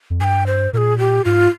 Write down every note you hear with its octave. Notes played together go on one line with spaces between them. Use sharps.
F2
G2 G5 G#5
C5
A#2 G#4 A#4
G4
G#2 F4